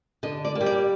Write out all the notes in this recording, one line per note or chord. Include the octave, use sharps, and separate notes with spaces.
D3 D#5
D5
A#3
G3
D5